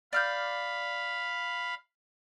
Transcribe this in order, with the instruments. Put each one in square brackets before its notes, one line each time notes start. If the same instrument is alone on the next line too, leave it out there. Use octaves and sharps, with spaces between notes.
[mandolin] D5 F6 G6 [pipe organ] F5 B5